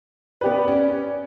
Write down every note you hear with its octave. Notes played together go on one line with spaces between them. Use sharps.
B3 G4 B4 D5
C#4